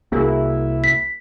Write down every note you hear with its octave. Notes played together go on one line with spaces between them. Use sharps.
C2 A#3 E4 F#4 G#4 A#4
B6